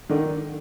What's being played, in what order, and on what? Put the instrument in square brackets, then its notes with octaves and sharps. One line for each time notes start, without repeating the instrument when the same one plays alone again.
[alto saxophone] D3 [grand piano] D#3